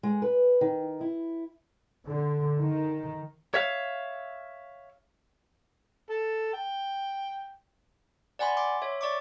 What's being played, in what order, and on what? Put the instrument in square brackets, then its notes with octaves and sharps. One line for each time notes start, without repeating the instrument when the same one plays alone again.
[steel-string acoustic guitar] G#3
B4
D#3
E4
[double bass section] D3
D#3
[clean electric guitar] C#5 E5 F5
[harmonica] A4
G5
[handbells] D5 F#5 G#5 B5 C6
C6 D6
C#5 E5
D5 C#6 D6